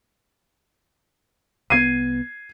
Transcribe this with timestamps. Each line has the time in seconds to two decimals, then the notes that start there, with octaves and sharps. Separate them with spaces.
1.70 C2 B3 G#6 C7 D#7